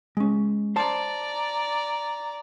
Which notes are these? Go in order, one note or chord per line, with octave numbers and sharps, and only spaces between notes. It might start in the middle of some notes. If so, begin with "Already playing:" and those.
G#3 C#4
C5 D5 A5 A#5